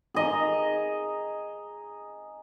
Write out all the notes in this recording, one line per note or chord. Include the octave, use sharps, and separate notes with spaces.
G#4 D#5 A#5